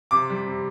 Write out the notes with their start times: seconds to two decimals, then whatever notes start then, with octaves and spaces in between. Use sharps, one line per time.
0.11 C3 D6
0.30 G3
0.47 C3